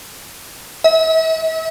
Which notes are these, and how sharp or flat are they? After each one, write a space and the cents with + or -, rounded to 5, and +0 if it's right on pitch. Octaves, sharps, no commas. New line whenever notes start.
E5 -40